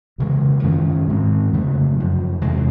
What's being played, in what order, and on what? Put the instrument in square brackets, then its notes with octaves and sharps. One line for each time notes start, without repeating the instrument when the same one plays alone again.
[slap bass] F2 C#3 E3 G#3
F#2 D#3 G#3 C#4
G#2 D#3 G#3 C4
F2 C#3 F#3 A3
F#2 C#3 F3
E2 C3 D#3 G#3